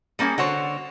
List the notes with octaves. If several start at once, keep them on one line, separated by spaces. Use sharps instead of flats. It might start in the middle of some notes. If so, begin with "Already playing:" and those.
G3 A#3 C#4 F4 G#4
D3 F#4 C5 C#5